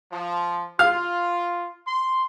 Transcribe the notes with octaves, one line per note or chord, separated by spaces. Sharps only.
F3
F4 F5
C6